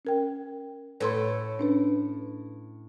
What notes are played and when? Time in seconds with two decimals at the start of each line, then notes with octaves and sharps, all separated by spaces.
0.05 C#4 A#4 G5
1.00 A2 A4 B4 C6
1.59 C#4 D4 B4